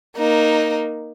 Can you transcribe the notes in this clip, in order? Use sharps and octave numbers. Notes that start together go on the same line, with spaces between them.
A#3 D#4